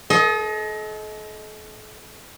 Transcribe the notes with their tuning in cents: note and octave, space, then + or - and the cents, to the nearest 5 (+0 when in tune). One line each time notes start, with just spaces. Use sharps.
A4 -40 D#5 +20